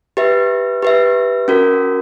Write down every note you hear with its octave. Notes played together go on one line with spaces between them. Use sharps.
G4 B4 E5
G4 B4 E5
C#4 F#4 A#4